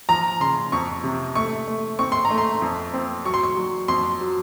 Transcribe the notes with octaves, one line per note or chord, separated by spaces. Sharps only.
F3 A#5
C#3 C6
F2 C#6
C3
A3 C#6
A3
C4 C#6
C6
A#5
A3
C6
F2
C4
F#3 C#6
C6
C#6
F#3
F2 C6
F#3